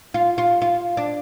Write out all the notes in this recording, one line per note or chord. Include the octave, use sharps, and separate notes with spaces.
F4
F4
F4
D4